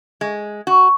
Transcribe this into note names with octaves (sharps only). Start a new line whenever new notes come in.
G#3
F#4